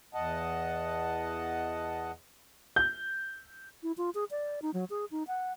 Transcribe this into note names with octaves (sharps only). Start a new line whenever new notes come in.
E2 D#5 F#5 A5
G6
E4
F4
G#4
D5
D#4
F#3
G#4
D#4
F#5